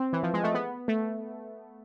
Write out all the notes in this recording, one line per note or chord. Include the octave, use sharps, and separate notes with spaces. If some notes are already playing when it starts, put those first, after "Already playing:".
Already playing: C4
E3
F3
G#3
A3
B3
A3